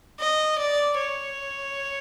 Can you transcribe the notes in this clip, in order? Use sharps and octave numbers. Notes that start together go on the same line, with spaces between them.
D#5
D5
C#5